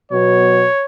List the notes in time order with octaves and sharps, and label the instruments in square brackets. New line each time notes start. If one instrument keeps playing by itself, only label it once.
[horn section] B2 F#3 B3 C#5